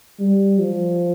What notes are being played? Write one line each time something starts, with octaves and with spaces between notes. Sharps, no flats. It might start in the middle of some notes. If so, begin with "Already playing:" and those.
G3
F3